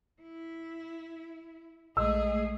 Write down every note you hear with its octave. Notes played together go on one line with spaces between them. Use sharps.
E4
A#1 G#3 A3 G#4 D#5 E6